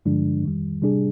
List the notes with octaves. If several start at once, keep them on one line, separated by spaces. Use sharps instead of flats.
G2 D3 F3 G#3 D4
F2 D#3 G3
C3 G3 D4 G#4